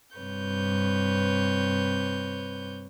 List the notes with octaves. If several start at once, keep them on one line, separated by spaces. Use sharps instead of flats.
G2 C3 B4 C#5 G6